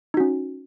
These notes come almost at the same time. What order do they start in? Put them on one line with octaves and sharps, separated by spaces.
D#4 F#4 C#4